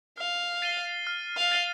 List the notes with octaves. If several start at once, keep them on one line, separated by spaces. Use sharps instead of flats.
F5 F6
A6 C7 D#7 G7
F6
F5
A6 C7 D#7 G7